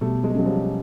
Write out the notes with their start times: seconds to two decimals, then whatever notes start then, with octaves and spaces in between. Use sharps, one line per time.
0.01 B2 G3 A3
0.24 G#3
0.30 A3
0.35 F#3 G#3 C#4
0.45 F3 G3